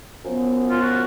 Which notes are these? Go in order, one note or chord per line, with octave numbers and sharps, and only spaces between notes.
F#2 F3 B3
F4
F#4